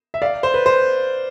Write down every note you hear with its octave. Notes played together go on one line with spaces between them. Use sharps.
E5
D5 F5
C5
B4
C5